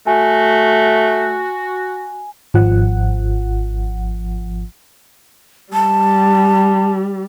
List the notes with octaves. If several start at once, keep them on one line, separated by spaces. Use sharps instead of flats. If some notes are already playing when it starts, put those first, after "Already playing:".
A3 F#4 G#5
G#1 F3 F#5
G3 A5